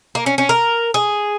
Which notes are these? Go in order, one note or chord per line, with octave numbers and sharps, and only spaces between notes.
A#3
C#4
C#4
A#4
G#4